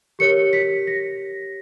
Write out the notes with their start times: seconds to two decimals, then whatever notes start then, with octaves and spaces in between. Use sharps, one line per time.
0.19 G4 A#4 C#5 C#7
0.53 B6
0.87 A#6